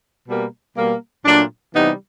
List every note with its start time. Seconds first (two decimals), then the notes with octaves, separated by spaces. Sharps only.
0.26 B2 G3 A#3
0.75 B2 G3 A#3
1.25 A#2 F#3 A3 D4
1.74 C3 E3 G3 B3 D#4